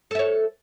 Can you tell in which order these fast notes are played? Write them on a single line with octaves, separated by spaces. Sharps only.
A4 E5 C#5